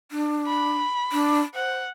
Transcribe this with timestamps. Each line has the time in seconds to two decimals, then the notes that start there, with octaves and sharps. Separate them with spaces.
0.12 D4
0.47 B5
1.12 D4
1.55 C5 F#5